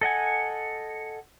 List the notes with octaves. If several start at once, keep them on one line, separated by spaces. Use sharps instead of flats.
A4 D#5 F#5 G#5